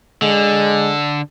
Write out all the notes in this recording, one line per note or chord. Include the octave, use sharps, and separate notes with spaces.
D3 G#3